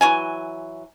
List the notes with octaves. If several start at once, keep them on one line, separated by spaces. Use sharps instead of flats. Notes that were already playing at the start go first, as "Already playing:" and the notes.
E3 F#3 G#5